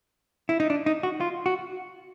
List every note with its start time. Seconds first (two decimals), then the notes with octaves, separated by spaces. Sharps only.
0.49 E4
0.60 D#4
0.70 D4
0.86 D#4
1.03 F#4
1.21 F4
1.46 F#4